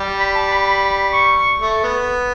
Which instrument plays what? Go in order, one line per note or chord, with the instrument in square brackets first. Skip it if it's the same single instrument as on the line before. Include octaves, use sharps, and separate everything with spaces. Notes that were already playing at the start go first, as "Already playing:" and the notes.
Already playing: [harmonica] G3
[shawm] B5
A5
B5
B5
C#6
[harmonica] A3
B3